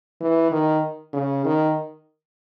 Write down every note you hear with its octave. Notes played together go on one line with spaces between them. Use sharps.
E3
D#3
C#3
D#3